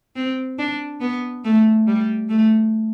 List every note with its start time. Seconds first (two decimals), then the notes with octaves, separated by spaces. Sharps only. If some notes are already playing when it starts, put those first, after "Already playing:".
0.16 C4
0.58 D4
1.00 B3
1.44 A3
1.87 G3
2.29 A3